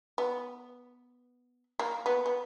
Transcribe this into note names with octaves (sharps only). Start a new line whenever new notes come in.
B3
A#3
B3
B3